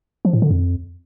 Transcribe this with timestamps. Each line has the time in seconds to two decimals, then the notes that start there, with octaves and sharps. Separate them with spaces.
0.25 F3
0.33 A2
0.42 D3
0.51 F2